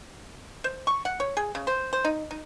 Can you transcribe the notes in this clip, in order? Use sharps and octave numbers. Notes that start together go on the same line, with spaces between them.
C5
C#6
F#5
C#5
G#4
C#3
C5
C5
D#4
D#4